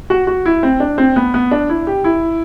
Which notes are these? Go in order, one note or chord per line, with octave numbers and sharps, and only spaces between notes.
F#4
F#4
E4
C4
D4
C4
B3
B3
D4
E4
G4
E4